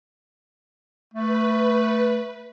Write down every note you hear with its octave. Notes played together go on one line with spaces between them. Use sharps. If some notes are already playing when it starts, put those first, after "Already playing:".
A3 B4